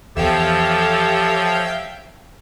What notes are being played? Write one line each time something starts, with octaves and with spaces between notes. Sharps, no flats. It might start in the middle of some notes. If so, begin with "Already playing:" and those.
E2 F3 G4 A4 C#5 E5 F5 G5